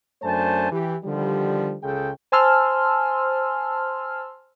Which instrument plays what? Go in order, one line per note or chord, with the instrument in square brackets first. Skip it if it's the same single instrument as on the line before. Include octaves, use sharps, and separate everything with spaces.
[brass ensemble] F#2 A3 D4 C5 G#5 A5
E3 G4
D3 D#3 F3 G3
C#2 C#3 G#3 G#4 A4 G5
[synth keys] C5 G#5 A5 C6 E6 F6